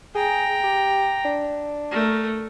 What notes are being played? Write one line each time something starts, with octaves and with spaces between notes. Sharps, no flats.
G#4 G5 A#5
G4
D4
A3 A#4